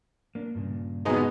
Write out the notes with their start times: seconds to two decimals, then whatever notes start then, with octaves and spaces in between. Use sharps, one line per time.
0.35 A#3 D4
0.55 G2 A#2 C#3
1.05 B2 G#3 B3 D#4 G#4